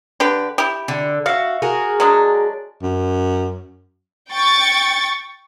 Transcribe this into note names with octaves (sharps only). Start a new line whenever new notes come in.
D3 G4 B4
E4 G4
D3
F#4 E5 F5
F#4 G#4 A#4
F#3 G#3 D4
F#2
G5 C#6 A6